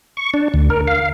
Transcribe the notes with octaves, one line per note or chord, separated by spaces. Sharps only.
C#6
D4
D2
A#4
F5